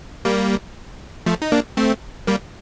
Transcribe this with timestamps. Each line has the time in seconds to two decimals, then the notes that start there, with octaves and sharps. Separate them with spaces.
0.25 G3 A#3
1.26 F3 A3
1.42 D#4
1.52 A#3 D4
1.77 A3 C4
2.27 G3 A#3